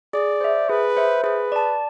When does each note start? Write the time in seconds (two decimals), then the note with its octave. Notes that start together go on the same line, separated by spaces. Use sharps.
0.13 G#4 D5
0.41 C5 E5
0.69 G#4 B4
0.97 C5 E5
1.23 G#4 B4
1.52 D5 A5